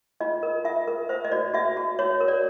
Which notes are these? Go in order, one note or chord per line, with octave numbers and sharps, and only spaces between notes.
F4 D#5
A#4
F4 E5
A#4
C5 E5
D#5
F#4 D5
F#4 E5
F#4
F#4 C#5
A#4
D5